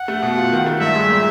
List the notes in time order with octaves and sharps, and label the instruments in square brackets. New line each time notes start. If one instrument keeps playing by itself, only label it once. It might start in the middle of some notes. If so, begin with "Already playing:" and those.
Already playing: [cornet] F#5
[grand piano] A3
B2
F4
D#3
A3
[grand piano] G2 [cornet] E5
[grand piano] G#3
A#2